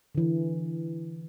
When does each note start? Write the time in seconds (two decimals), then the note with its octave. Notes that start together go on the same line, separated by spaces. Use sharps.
0.15 D3 E3